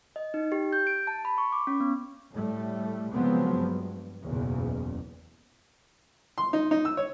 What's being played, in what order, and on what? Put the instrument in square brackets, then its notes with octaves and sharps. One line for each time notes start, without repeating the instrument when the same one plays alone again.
[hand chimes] D#5
D#4
G4
G6
D7
A5
B5
C#6
D6
C#4
B3
[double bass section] A2 G3 A3
C#3 F3 F#3 G#3 B3 C4
G2
F#1 B1 E2 C#3
[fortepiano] C6
D#4
D#4
E6
C#5